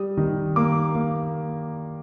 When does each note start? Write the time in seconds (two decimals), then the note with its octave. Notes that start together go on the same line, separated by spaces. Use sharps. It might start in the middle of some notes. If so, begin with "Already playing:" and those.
Already playing: G3 D#6
0.17 D#3
0.56 A#3 D6
0.95 A#3